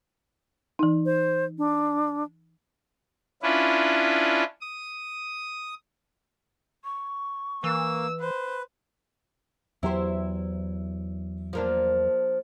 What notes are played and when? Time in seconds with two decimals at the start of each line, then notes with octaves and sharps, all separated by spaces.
0.79 E3 D#4
1.06 C5
1.58 D4
3.43 C#4 D4 E4 F4 B4
4.61 D#6
6.84 C#6
7.64 E3 A#3 E6
8.20 B4 C5
9.83 E2 F#3 E4 G4 C5
11.53 F3 A#3 D4